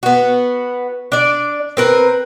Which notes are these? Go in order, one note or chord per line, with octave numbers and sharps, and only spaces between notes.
B3 F#4
D4 D5
C4 A#4 B4